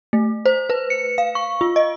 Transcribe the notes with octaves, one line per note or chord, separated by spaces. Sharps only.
A3
C5
B4
C#7
F5
C#6
F4
D#5